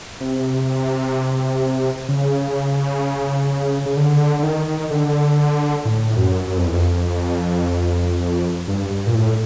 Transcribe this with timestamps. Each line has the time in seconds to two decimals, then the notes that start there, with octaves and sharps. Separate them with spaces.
0.20 C3
2.08 C#3
3.85 C#3
3.97 D3
4.39 D3
4.43 D#3
4.90 D3
5.85 A2
6.17 F#2
6.47 F#2
6.57 F2
6.66 E2
6.74 F2
8.68 G2
8.90 G2
9.07 A#2
9.15 A2